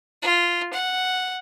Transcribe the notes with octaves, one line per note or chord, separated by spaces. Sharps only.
F4
F#5